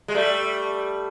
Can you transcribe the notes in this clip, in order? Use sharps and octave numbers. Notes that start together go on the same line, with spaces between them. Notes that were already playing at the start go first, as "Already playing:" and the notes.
G#3
G3 A3